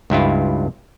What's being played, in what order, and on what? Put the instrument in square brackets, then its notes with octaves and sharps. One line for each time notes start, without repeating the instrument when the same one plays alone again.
[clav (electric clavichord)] C#2 G2 E4 F4